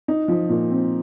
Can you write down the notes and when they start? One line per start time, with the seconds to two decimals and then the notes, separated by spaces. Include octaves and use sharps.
0.08 D#4
0.28 F3
0.49 A#2
0.70 C4